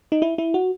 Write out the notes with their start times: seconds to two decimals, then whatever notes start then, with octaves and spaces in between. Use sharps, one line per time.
0.12 D#4
0.22 E4
0.38 E4
0.54 F#4